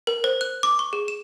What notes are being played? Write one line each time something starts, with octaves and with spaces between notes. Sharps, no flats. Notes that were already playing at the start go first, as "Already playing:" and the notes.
A#4
C5
F#6
D6
C#6
G#4
E7